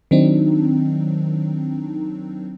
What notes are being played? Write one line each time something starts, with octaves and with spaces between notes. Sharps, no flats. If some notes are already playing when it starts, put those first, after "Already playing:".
D#3 F#3 C4 D4 D#4